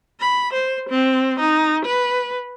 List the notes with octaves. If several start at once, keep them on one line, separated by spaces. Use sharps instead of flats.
B5
C5
C4
D#4
B4